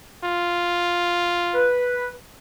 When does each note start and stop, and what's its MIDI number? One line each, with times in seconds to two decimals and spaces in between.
0.24 1.71 65
1.55 2.11 71